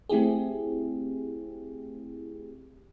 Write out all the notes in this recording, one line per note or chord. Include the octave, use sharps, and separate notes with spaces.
A3 C4 E4 G4 G#4